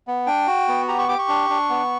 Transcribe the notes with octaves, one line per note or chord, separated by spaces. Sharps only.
B3
D4 G5
F#4
B3
G4 A#5
C#6
G4 D6
C#6
D4
D4
B3